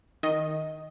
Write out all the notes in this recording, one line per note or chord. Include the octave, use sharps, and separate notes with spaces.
D#3 D#5